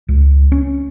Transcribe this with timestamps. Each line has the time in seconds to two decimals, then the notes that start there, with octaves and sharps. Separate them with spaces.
0.08 C#2
0.52 C#4